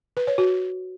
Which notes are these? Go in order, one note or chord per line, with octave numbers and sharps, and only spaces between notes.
B4
C#5
F#4